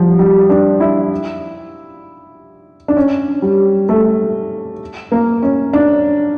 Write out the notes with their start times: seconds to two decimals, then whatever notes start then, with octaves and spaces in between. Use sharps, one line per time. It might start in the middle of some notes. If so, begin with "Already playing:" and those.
Already playing: F3 G3
0.19 G3
0.50 D4
0.80 E4
2.88 D4
2.97 C#4
3.42 G3
3.89 A3
5.12 A#3
5.43 C#4
5.73 D4